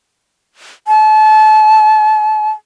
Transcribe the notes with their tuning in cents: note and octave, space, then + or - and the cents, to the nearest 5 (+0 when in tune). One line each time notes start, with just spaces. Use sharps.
A5 -30